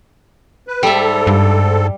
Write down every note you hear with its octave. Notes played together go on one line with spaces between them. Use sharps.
B4
G#2 G3 A4 E5
G2